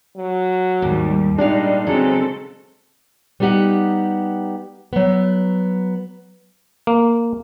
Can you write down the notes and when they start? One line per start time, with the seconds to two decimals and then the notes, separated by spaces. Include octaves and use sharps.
0.17 F#3
0.82 D#2 G#2 G3
1.38 A#2 G3 G#3 D4 D#4 F5
1.87 C#3 F#3 G#3 C4 A4
3.40 G3 B3 D#4 G4 F#5
4.93 F#3 B3
6.87 A#3